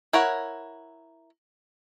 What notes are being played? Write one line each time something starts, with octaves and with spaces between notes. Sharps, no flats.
E4 A#4 C#5 F#5